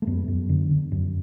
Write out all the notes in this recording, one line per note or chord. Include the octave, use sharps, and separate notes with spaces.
A3
F#2 B3
F#2
D3
D3
F#2